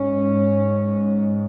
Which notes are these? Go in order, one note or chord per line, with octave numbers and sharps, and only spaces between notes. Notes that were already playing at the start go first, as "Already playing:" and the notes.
Already playing: G#2 C#4